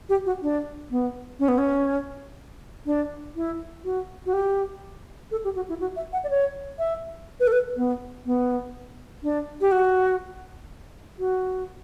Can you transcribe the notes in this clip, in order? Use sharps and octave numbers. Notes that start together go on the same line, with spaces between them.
G4
F#4
D4
B3
C#4
B3
C#4
D4
E4
F#4
F#4
G4
A4
G4
F#4
E4
F#4
E5
F#5
D5
C#5
E5
B4
A4
B4
B3
B3
D4
G4
F#4
F#4